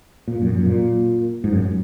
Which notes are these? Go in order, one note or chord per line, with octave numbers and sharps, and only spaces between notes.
A#2
F#2
F#2
A#2
G#2
F#2